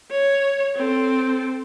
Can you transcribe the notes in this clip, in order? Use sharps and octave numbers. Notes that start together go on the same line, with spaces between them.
C#5
C4 A4